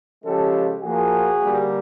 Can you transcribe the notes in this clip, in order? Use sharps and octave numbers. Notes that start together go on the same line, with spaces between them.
C#3 F3 G#3 G4 A4
A#2 F3 A#3 F#4 G#4
D3 G3 A#3